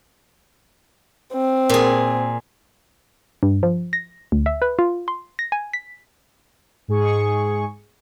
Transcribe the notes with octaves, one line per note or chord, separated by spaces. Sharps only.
C4
A#2 G#4
G2
F3
A#6
D2
E5
B4
F4
C6
A#6
G#5
B6
G#2 G#4 C#6